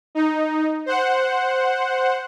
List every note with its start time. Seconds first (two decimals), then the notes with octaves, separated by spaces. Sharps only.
0.15 D#4
0.86 C5 F#5